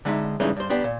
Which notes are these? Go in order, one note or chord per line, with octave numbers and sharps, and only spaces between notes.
D3 G#3 D#4 E5
G2 C#3 E3 G#3 A3 D#4
G2 C5
B3 D4 G4
A#2